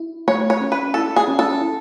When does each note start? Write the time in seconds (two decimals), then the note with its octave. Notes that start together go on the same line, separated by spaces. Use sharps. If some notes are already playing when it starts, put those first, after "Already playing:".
Already playing: E4
0.28 A3 C#5
0.50 C#5
0.61 C#4
0.72 B4
0.94 E4 A4
1.16 G#4
1.28 C#4
1.39 A4
1.61 E4